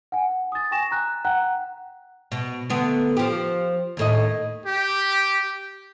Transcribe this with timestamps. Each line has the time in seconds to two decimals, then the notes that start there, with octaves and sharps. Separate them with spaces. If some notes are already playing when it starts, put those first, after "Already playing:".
0.12 F#5 G#5
0.52 D#6 A6
0.71 G5 G#5 C#6 A#6 E7
0.91 A#5 F#6
1.25 F#5 G5 A#5 F#6
2.32 B2
2.70 D3 A3 B3
3.17 F3 G4
3.97 D#2 A2 D#5
4.65 G4